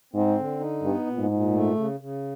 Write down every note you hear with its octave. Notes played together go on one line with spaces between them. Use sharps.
G#2 C4
D3
D#4
G2 B3
A#2
G#2
A#2
A3
C#3
C#3